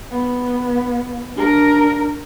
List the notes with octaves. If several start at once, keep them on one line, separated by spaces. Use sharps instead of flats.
B3
D4 A#4